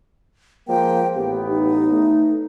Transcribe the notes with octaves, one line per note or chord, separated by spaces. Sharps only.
F3 G#3 A#3 G5
A1 B3 G4
D#4
A3